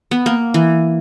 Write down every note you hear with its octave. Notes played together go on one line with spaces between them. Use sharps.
B3
A#3
E3